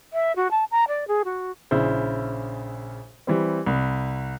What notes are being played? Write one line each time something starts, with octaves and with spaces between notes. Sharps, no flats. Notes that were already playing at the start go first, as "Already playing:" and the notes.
E5
F#4
A5
A#5
D5
G#4
F#4
A#1 C#3 E4 C5
E3 G3 C4
C2